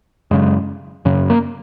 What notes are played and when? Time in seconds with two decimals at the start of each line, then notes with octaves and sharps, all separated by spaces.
0.31 F#2 C#3 G#3
1.05 F#2 C#3
1.30 A#3